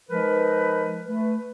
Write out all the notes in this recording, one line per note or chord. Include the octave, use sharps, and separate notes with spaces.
F3 G#3 D#4 A#4 B4
A3 B4